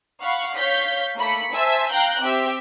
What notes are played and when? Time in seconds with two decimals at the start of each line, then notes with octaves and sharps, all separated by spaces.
0.22 F5 F#5 B5 C#6
0.57 C#5 F5 G6 B6
1.16 A3 A#3 B5 C#7
1.54 C5 E5 G#5 A5 E6
1.91 F5 G5 A#5 F#6 G6
2.20 C4 G4 E5